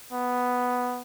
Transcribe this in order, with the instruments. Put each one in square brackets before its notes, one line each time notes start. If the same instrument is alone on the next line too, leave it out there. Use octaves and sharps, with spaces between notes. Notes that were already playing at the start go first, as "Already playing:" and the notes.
[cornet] B3